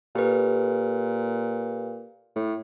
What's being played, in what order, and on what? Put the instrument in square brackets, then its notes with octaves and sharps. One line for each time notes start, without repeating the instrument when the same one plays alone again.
[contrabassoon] A#2 [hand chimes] G4 A4 B4
[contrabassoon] A2